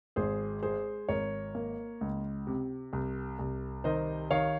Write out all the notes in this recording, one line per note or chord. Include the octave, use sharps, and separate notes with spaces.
G#1 G#4 C5
G#3 G#4 C5
G#1 A#4 C#5
A#3
C#2
C3
C2
C2
D#3 C5 D#5
D#3 C#5 F5